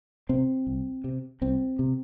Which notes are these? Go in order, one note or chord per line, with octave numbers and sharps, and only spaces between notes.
C3 C4
C2
C3
C2 C4
C3